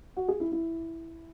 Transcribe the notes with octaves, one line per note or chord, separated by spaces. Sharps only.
F#4
G#4
E4
E4